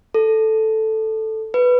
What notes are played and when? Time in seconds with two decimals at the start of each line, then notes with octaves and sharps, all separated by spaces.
0.14 A4
1.54 B4